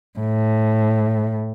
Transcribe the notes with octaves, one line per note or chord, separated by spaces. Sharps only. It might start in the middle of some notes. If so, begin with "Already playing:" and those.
A2